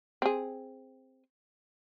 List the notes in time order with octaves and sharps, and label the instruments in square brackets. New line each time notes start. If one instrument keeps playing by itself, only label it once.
[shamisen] C4 G#4